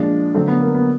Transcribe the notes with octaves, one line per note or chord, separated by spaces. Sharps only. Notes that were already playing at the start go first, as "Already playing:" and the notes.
Already playing: A#2 F3 G#3 D4
D3 F#3 A3 C4
B3
A#3
B3